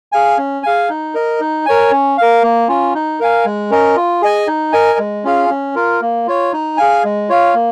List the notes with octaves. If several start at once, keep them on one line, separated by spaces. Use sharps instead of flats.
G#4 F5 G#5
C#4
G#4 F5 G#5
D#4
A#4 D#5
D#4
A#4 C#5 G#5
C#4
A#4 F5
A#3
C#4 F4
D#4
A#4 F5 G#5
G#3
C#4 A#4 D#5
F4
G#4 D#5 G#5
D#4
A#4 D#5 G#5
G#3
C#4 F4 G#4 F5
C#4
F4 A#4
A#3
F4 C#5
D#4
G#4 F5 G#5
G#3
F4 C#5 F5
A#3